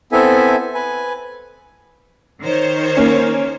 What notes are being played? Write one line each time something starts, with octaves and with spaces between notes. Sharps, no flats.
B3 C4 E4 A4 E5 G#5
B4 G#5
D#3 C5 C#5
A#3 C#4